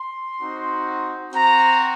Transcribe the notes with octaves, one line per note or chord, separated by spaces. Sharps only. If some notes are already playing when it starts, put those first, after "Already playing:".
Already playing: C6
C4 D#4 F#4
C4 F#4 A#5